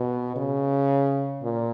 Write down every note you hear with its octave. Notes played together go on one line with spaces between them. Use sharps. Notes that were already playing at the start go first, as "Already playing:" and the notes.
Already playing: B2
C#3
A#2